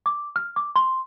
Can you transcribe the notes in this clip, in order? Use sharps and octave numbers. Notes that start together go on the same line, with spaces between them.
D6
F6
D6
C6